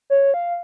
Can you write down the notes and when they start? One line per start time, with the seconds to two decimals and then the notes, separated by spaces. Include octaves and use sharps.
0.10 C#5
0.34 F5